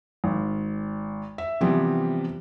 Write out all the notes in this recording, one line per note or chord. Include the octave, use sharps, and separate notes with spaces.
G#1
E5
C3 E3 F3 G3 B3 C4